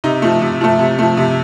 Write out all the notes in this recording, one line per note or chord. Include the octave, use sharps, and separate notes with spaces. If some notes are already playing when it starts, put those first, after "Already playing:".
C3 D#4
F3 A3
C3
F3 A3
C3
F3 A3
C3